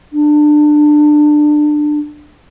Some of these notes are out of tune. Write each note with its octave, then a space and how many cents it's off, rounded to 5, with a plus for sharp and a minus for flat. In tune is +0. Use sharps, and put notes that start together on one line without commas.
D4 +20